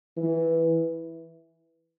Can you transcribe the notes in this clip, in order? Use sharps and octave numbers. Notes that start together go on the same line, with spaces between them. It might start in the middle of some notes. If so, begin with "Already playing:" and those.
E3